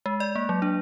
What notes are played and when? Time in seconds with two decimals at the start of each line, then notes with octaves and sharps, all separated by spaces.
0.06 G#3
0.20 D5
0.35 A#3
0.49 F#3
0.62 D4